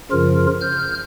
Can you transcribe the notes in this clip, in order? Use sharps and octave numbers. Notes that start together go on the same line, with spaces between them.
F#2 C#3 F3 F4 A#4
F6 G6